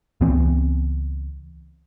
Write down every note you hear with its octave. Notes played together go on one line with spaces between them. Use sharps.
C#2 E3 B3 C4